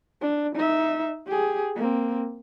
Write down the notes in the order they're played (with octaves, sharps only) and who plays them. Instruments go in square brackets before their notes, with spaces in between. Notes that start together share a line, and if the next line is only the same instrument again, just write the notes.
[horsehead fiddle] D4
D#4 E5
G4 G#4
A#3 C4